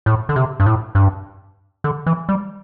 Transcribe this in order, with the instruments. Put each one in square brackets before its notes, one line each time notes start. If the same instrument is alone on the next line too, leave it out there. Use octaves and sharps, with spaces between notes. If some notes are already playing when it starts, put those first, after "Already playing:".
[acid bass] A2
D3
C3
G2
A2
G2
D3
E3
G3